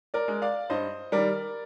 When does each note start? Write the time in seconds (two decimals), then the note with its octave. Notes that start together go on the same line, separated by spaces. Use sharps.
0.14 A#4 D5
0.28 G#3
0.42 D5 F5
0.70 G2 C5 D#5
1.12 D#3 G3 A#4 D5